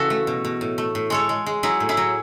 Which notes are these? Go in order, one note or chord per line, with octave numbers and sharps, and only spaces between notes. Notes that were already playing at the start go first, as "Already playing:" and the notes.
Already playing: C#3 E3 F#4 A4
A3
B2
B2
A2
A3
A2
G#3 A4 C#5
G#3
G#3
F#3 E4 G#4
A2
E4 G#4
F#3